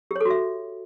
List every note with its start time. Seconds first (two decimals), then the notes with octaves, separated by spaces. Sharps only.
0.11 G4
0.16 C#5
0.21 A4
0.25 F#4
0.30 E5